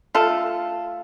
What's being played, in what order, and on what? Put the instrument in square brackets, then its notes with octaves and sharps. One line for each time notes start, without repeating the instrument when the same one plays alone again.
[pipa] A3 F4 A4